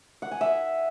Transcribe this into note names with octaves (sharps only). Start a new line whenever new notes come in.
F#5
G#5
E5